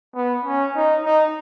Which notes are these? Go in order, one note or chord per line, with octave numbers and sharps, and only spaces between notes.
B3
C#4
D#4
D#4